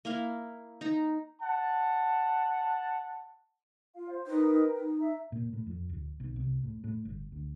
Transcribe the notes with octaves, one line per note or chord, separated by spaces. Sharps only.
A#3 E4 F5
D#4 A#5
F#5 A5
F4 F5
C5
D#4 A#4 B4 G5
D#4
E5 A#5
A#2
A2
F2
D1
B1
C2
A2
A2
G1
D2